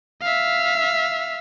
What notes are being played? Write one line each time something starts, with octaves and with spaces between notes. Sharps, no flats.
E5 F5